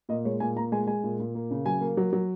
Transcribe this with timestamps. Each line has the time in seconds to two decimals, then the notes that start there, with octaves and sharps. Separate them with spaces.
0.09 A#2 D#5
0.25 G#3 C#5
0.40 A#2 G#5
0.56 A#2 A#5
0.72 G#3 G#5
0.87 G#3 G#5
1.04 A#2
1.19 A#2
1.35 A#3
1.51 C#3
1.65 F#3 G#5
1.81 A#3
1.97 F#3
2.13 F#3